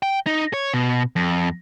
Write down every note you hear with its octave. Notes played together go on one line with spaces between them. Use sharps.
G5
D#4
C#5
B2
F2